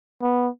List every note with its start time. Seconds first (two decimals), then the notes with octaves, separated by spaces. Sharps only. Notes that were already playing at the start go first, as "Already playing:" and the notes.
0.22 B3